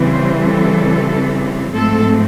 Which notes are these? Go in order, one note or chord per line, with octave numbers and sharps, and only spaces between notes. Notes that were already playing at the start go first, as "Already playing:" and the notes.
Already playing: C#3 E3 G3 C4
C5
A4
G#2 F3 A3 C4 A4